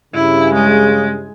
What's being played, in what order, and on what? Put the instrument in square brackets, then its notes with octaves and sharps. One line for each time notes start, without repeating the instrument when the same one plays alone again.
[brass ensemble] G2 C#3 [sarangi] E4
[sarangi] G#3